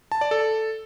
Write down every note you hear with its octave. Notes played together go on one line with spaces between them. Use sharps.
A5
D5
A4